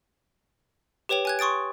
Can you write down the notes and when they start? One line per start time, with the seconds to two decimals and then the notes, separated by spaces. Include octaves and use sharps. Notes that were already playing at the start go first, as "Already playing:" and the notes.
1.09 G4 B4 C#5 G5 F7
1.25 G#5 F#6 G#6
1.39 C6 C#6 D#6 A6 D7